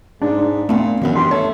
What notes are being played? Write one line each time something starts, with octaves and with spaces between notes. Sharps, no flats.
G#2 D4
A#2 A3 B3 C4
F#2 D#3 E3 B3
G2 C6
A3 C#5